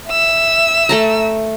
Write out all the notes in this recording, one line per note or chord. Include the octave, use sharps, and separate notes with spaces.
E5 E6
A3 A5 A#5